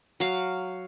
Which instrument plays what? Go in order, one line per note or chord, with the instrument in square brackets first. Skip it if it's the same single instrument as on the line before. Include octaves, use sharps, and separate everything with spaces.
[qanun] F#3 F5